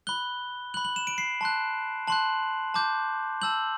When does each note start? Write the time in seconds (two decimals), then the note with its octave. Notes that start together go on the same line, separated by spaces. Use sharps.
0.07 B5 F#6 G7
0.74 B5 F#6 F#7
0.85 F#7
0.96 E7
1.07 D7
1.18 C7
1.41 A5 C6 F#6
2.07 A5 C6 F#6 F#7
2.74 A5 D6 G6
3.42 A5 E6 G6 F#7